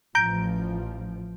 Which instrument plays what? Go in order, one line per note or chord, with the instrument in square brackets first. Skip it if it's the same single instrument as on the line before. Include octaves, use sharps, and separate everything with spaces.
[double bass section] A1 F3 [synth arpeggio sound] A#5 G6 D7